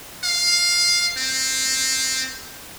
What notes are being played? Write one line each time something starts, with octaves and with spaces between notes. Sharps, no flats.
F5
C4